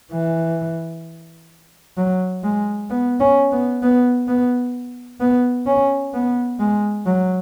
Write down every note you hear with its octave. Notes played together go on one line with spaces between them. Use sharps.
E3
F#3
G#3
B3
C#4
B3
B3
B3
B3
C#4
B3
G#3
F#3